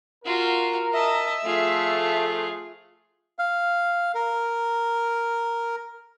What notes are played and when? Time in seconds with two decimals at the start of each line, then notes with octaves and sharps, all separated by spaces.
0.25 F4 F#4 A#4
0.93 D#5 E5 A5
1.45 F3 A3 F4 G#4
3.39 F5
4.15 A#4